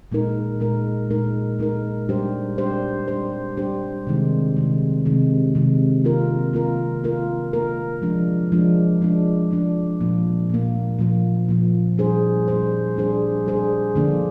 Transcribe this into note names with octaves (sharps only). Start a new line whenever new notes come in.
A#2 G#3 D#4 A#4
A#2 G#3 D#4 A#4
A#2 G#3 D#4 A#4
A#2 G#3 D#4 A#4
G3 D4 G4 C5
G3 D4 G4 C5
G3 D4 G4 C5
G3 D4 G4 C5
C3 D#3 G#3
C3 D#3 G#3
C3 D#3 G#3
C3 D#3 G#3
A#3 F4 A#4
A#3 F4 A#4
A#3 F4 A#4
A#3 F4 A#4
F3 G#3 D4
F3 G#3 D4
F3 G#3 D4
F3 G#3 D4
A#2 F3 A#3
A#2 F3 A#3
A#2 F3 A#3
A#2 F3 A#3
G3 D4 G#4 C5
G3 D4 G#4 C5
G3 D4 G#4 C5
G3 D4 G#4 C5
D3 F3 A#3 D4